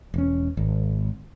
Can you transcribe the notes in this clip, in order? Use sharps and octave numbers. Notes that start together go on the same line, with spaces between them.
E1 C#4
G#1